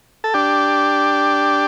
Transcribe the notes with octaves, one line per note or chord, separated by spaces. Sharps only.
A4
D4 G4